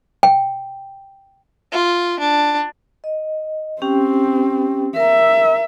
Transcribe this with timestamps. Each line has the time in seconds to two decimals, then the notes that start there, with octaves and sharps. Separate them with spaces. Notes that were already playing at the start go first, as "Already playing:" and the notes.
0.23 G5
1.73 F4
2.20 D4
3.04 D#5
3.82 C4 C#4 G4 G5
4.96 A#4 E5 A#5